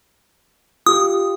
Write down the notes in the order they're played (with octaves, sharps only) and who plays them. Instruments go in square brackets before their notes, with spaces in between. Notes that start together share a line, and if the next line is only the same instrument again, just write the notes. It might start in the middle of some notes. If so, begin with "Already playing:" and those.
[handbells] F4 G4 [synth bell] D#6